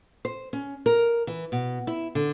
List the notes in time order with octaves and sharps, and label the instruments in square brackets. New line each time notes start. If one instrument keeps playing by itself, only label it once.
[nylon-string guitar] C5
C#4
A#4
E3
B2
E4
D3